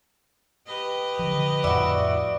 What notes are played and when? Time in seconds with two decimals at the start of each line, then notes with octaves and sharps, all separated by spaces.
0.67 G4 B4 D#5
1.19 D3 F3
1.64 F2 A2 E4 F#4 D5